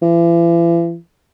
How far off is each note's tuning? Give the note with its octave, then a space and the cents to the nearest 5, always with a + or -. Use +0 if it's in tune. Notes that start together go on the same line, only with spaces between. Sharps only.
E3 +40